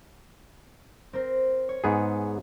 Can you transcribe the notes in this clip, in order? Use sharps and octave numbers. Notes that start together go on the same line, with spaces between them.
C4 A#4 C5
C#5
G#2 B3 G#4